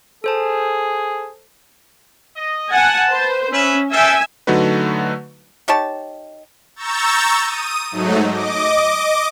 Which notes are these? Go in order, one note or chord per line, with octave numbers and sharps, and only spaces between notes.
G#4 A4 C5 A5
D#5
F#5 G#5 A5
B4 C5
C#4 B4 E5
A4 E5 F5 G5 G#5
D3 F#3 A3 D#4 F#4 B4
D#4 G4 C#5 A5
A#5 C#6 E6 G6 A6
D#6 D#7
G#2 F#3 A3 D#4
D#5 D6